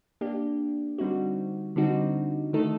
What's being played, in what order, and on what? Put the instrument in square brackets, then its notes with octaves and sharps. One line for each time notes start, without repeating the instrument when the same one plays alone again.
[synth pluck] A#3 D4 G4
D3 G3 C4 D#4 F#4
D3 G3 C4 D#4 F#4
D#3 A3 D#4 A4